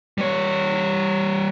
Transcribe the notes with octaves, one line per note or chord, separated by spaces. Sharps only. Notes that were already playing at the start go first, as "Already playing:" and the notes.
G3 C#5